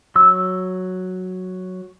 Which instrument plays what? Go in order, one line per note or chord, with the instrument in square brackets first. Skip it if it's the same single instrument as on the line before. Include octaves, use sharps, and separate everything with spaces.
[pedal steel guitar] F#3 E6